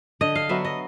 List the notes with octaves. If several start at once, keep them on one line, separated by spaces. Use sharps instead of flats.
D3 D#5
F5
F#3 B3 E5
D#5